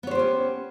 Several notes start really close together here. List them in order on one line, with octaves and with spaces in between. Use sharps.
B3 C#5 C5 G4 C#4